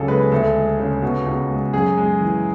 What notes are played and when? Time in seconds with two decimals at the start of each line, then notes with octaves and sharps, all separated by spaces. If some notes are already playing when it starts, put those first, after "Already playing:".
Already playing: C#2 C#3 F#3 G#4 A4
0.08 G#3 B4
0.32 D2 A4
0.56 G#3
0.80 C#3
1.02 B2
1.26 C#2
1.50 G#3
1.73 F#2 G#4
1.97 G#3
2.21 E3